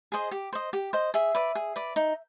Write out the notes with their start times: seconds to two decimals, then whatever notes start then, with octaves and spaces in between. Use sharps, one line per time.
0.12 G#4 C5 D#5
0.31 G4
0.53 C5 D#5
0.73 G4
0.93 C5 D#5
1.14 G#4 E5
1.35 B4 D5
1.55 G#4
1.76 B4 D5
1.96 D#4